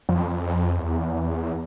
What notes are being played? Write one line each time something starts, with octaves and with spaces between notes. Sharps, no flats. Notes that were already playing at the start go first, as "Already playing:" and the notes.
F2
E2